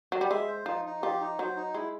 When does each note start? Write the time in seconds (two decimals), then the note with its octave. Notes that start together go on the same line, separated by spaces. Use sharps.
0.12 F#3
0.21 G3
0.30 G#3 E5
0.48 C5
0.66 F3 D#4
0.85 D#4
1.02 F3 G4
1.21 D#4
1.39 F#3 C5
1.56 D#4
1.74 G#3 E4